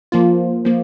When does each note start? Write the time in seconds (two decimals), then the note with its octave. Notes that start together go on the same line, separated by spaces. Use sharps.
0.12 F3 A#3 F4
0.65 F3 A#3